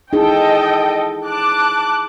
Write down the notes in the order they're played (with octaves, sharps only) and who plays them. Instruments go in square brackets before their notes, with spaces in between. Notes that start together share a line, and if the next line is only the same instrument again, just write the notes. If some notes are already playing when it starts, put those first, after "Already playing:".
[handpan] D#4 E4 G#4 [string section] A4 D#5 G5
[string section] A5 D6 F#6